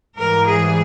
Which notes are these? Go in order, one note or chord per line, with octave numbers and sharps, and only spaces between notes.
G#2 E3 G3 A#4
G#4